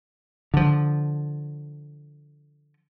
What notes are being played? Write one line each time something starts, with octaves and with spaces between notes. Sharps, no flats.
D3 F3